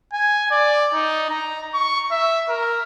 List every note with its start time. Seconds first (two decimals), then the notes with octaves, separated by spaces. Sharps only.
0.13 G#5
0.51 D5
0.94 D#4
1.30 A#5
1.74 C#6
2.11 E5
2.49 A#4